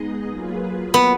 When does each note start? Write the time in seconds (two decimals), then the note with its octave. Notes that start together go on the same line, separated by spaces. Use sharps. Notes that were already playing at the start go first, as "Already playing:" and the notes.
Already playing: G#3 B3 D#4 G#4 D#5
0.29 F#3 A#3 F4 G#4 B4
0.94 B3